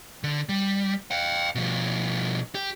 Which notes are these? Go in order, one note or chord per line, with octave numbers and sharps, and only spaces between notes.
D3
G3
F5 G5
B2 F3
G4